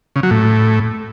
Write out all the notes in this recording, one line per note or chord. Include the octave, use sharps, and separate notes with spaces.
C#3
F#3
A2